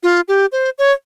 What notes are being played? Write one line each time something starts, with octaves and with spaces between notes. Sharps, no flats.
F4
G4
C5
C#5